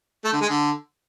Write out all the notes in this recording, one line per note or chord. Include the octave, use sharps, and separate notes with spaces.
A3
D3
G#3
D3